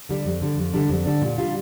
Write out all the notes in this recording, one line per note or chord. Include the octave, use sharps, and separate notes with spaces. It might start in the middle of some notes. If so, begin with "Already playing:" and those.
D3 G3 D4
F2
D3 G3 D4
F2
D3 G3 D4
F2
D3 G3 D4
A#2
G3 D4 F4